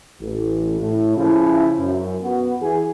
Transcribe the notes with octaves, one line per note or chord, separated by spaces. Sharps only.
A1
A2
C#3 F3 E4
F#2
B3 F#4
E3 G#4